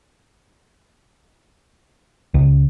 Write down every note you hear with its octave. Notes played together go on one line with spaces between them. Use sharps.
C#2